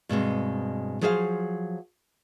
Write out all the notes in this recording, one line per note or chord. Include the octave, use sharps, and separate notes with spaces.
G2 B2 G#3 C4
F3 F#3 G#4 C5 E5 F5